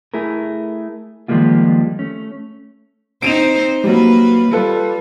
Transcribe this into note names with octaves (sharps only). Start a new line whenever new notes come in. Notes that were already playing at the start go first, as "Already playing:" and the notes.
A3 E4 G#4 A#4
D#3 F3 G3 G#3 A#3 F4
A3 C#4
C4 D#4 C5 D7 D#7 F7
F#3 G3 A#3 B4
G3 F4 A4 B4